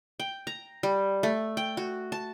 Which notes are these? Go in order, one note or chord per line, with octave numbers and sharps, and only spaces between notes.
G5
A#5
G3
A3
G5
F#4
A5